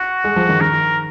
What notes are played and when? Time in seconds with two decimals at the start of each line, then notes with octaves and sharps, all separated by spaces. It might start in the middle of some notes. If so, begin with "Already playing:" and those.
Already playing: F#4
0.24 G#3
0.36 F3
0.49 D#3
0.61 D#3 A#4